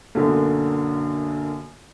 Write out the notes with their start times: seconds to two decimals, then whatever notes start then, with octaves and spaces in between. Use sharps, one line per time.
0.15 B1 F#2 D3 F#3 A#3